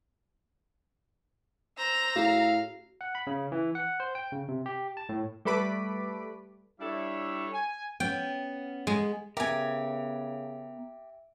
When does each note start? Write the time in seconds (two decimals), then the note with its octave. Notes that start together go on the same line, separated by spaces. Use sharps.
1.78 C5 A#5 E6
2.16 A2 C#4 F#4 G#4 F5
3.01 F#5
3.15 B5
3.27 C#3
3.52 E3
3.75 F#5
4.00 C5
4.15 G5
4.32 C#3
4.48 C3
4.66 G4
4.97 A5
5.09 A2
5.45 G3 A3 A4 B4 B5 D6
6.80 G3 D4 E4 A4 C#5 E5
7.53 G#5
8.00 B3 C#4 G5
8.87 G#3 B3
9.37 C#3 B3 G4 A#4 E5 G#5